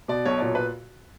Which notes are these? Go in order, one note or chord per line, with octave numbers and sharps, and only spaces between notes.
B2 D5
B1 C#5
D5
A#2 C#5
B4